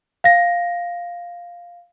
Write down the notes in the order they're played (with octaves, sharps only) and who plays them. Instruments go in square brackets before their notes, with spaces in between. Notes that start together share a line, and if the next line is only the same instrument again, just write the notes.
[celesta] F5 A#6